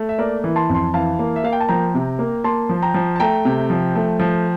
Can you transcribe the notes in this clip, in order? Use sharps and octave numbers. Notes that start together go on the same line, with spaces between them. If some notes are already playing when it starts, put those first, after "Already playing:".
Already playing: A3
E5
A#3 A#4 D5
E3
A5 C6
F2
A5 C6
E3 F5 A5
A#3
E5
A#3 F5
G5
A5
F3 G5 A#5
C3
A#3
A#3 A5 C6
F3
G5 A#5
F3
A5
A3 G5 A#5
C3
F3
A3
F3